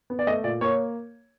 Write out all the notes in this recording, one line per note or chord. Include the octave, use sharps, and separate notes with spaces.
B3
D5
A3 D#5
A#2 D5
A#3 C#5